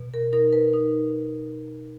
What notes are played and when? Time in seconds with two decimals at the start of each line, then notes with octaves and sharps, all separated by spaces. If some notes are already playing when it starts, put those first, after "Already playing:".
Already playing: B2
0.14 A#4
0.33 D#4 A#4
0.53 B4
0.74 D#4